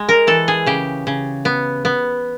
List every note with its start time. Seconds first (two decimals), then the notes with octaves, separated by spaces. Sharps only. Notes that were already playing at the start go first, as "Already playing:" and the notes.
Already playing: G#3
0.09 A#4
0.27 E3 A4
0.48 G#4
0.66 C#3 G4
1.07 C#3
1.45 B3
1.85 B3